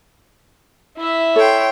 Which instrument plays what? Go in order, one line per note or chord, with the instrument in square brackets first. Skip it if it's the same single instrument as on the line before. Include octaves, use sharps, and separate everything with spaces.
[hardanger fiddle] E4 E5
[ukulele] A4 [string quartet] C#5 G5 C6